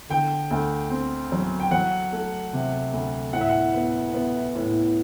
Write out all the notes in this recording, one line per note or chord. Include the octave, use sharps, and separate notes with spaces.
D3 G5
D2
C4
F#3
G5
F#3 F#5
A3
C3
D2
A2 F#5
E5
F#5
B3
B3
A2